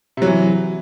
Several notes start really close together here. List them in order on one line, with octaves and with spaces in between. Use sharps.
C3 F#3 E3